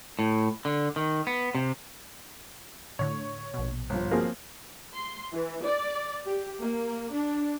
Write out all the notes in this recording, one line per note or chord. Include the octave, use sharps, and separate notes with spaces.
A2
D3
D#3
B3
C3
A2 D3 C#5
A#1 B2
G1 F3
F3 A#3 C4 F#4 G#4 A#4
C6
E3
D5
G4
A#3
D4